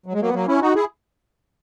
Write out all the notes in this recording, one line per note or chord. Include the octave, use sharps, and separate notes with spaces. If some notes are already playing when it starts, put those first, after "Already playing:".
F#3
G#3
F#3 A#3
B3
F#3 A#3
C#4 E4
D#4 F#4
E4 G#4